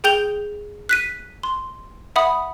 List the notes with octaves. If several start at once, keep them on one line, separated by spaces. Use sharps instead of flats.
G#4 G5 G6 F7 G7
F#6 B6 D#7
C6
E5 F#5 B5 D#6